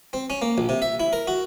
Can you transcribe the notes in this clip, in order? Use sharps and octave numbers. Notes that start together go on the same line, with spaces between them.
C4
C#4
A#3
A#1
C3
E5
E4
A#4
F#4